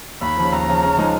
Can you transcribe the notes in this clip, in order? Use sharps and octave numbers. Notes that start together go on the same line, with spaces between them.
D#2 B5
C#3 F3
D#2 A#5
C#3 F3
C#3
F3 G#3 D#4